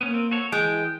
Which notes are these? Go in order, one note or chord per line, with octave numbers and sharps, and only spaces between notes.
A#3 B3 C#4
C4
F#4 A4 C#5
E3 G#3 G5